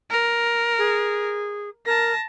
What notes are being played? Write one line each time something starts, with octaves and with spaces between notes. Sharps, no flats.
A#4
G#4
A#4 A5 A#6